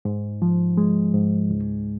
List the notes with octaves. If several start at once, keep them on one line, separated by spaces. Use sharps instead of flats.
G#2
F3
G#3
G#2
C#2